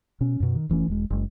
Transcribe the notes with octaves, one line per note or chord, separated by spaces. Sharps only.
B2 C#4
F#2 B2
D#3
F1 E3 A3 C#4
E1 G#3
F#1 G#3